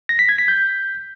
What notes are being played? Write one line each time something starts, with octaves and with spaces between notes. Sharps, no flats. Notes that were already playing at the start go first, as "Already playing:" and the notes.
A#6
B6
G#6
B6
G6